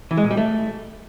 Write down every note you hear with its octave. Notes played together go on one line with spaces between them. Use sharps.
E3
G#3
A#2
G3
A3